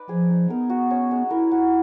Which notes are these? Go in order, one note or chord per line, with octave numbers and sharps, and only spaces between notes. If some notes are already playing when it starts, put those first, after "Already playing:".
Already playing: D#4 B4 D5
F3 G#4
D#4
B3 A#4
F#4
C#4
G#3
E4 A#4
F#4